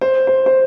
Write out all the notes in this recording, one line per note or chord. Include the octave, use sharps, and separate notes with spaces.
C5
C5
C5